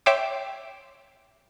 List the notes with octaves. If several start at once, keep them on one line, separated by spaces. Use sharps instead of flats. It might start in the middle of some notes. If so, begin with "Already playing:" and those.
C#5 E5 G5 C6 D6